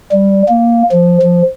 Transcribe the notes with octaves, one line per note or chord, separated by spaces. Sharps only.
G3
A#3
F3
F3